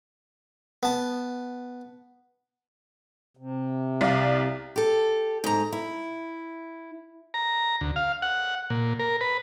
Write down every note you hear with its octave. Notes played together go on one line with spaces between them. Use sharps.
B3 A5
C3
C2 D5 F5
G4 A4
G#2 A#5
E4
A#5
D2
F5
F#5
A#2
A#4
B4